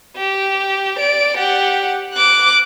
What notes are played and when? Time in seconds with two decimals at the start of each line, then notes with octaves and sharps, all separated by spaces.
0.17 G4
0.98 D5 D7
1.37 G4 F#5
2.14 D6 F#6